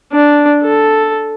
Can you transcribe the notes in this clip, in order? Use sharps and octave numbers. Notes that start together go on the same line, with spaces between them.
D4
A4